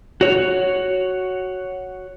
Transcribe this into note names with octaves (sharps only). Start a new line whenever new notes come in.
F#4 C#5